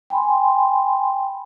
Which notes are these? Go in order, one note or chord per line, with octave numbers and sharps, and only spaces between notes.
G5 G#5 B5 C6